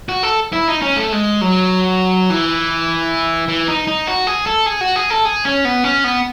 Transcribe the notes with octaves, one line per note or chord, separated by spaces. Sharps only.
F#4
A4
E4
D#4
C#4
A3
G#3
F#3
E3
E3
D#4
D#4
F#4
G#4
A4
G#4
F#4
G#4
A4
G#4
C#4
B3
C#4
B3